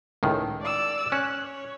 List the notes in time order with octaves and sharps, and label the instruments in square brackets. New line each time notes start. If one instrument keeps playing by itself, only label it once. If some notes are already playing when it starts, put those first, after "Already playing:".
[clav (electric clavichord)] C#2 A2 D#3
[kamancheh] D5 E6
[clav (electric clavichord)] C#4 [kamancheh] F#6
[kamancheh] C#5